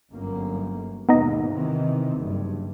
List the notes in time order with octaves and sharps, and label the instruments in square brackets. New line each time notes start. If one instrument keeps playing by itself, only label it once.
[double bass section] G1 F#2 A#3
[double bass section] D#2 G#2 B2 [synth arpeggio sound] B3 D#4 D#5
[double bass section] C3 D#3 E3
F#1 G2